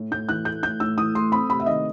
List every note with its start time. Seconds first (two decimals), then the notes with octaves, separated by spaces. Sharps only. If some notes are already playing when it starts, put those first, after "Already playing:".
Already playing: A2
0.11 A2 G6
0.29 E3 F#6
0.45 A3 G6
0.63 A2 G6
0.80 A2 E6
0.98 E3 D#6
1.15 A3 C6
1.32 C4 B5
1.49 C3 B5
1.60 E5
1.66 D#3 D#5